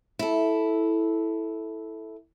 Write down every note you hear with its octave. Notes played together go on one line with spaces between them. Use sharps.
E4 A4